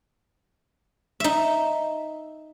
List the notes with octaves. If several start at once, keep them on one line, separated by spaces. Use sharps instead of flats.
D#4 E5